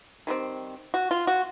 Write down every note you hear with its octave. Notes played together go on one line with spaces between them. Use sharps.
D#3 G3 C4
F#4
F4
F#4